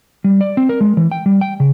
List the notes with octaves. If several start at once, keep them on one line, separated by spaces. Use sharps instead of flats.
G3
D5
C4
A#4
G#3
E3
G5
G3
G5
C#3